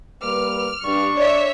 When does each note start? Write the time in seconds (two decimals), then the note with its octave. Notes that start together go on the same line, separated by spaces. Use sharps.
0.23 G3 A#3 B4 D6 F6
0.83 G2 D4 C#6
1.17 C#5 D5 E5